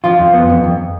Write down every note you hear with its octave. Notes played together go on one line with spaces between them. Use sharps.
F3 F4
F2
B3
F2
F2